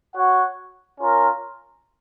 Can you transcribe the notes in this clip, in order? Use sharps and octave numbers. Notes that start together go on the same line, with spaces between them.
F#4 C#5 F#5
C#4 F4 A#4